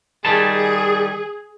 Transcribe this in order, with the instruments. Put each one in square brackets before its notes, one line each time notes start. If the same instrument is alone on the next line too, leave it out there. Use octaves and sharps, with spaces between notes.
[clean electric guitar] D#3 G3 A5 [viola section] G#4